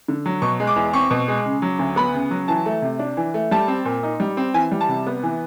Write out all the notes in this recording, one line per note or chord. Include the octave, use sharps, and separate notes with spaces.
D3
F#3
B2 C#6
G#3
D6
E2
C4 C#6
B2
G#3
C#3
F#3
D2
B3 B5
C#3
F#3
E3 A5
A3
C3
D4
E3
A3
G3 A5
C4
A#2
D#4
G3
C4
E3 G#5
G3
A5
C3
B3
E3